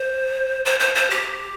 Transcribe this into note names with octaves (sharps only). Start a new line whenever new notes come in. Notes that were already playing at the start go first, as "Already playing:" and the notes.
Already playing: C5
C5
C5
C5
G4